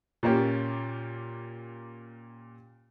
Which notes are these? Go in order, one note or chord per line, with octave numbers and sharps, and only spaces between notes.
A#2 A#3 C#4 G4